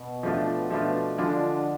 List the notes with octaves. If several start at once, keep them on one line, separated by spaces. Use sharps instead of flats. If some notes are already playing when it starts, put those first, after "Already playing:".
Already playing: B2
F3 A3 D4 F4
B2 F3 A3 D4 F4
D3 F3 G#3 D4 F4